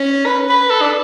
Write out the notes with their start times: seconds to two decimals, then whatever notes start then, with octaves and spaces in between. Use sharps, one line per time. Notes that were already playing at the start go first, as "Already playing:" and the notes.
Already playing: C#4
0.26 B4
0.50 B4
0.70 A4
0.82 D4